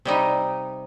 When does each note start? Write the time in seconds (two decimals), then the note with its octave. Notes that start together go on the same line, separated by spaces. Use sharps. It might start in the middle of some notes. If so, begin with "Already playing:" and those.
0.05 C3 G3 D#4